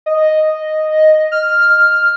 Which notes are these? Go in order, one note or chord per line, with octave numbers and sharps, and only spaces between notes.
D#5
F6